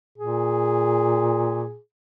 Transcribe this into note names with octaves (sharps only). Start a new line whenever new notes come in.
A#2 G#4